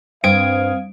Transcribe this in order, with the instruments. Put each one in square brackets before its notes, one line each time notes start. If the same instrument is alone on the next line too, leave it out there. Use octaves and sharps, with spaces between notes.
[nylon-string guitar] G2 [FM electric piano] C4 D#6 G#6 [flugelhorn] F5 [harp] D7